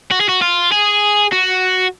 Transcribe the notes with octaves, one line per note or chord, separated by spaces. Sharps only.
F#4
G#4
F#4
F4
G#4
F#4